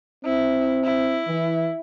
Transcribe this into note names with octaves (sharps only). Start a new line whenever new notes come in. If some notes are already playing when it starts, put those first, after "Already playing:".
C4 E4
E4
E3